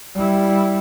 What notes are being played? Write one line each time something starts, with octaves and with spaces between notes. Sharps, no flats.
G3 E4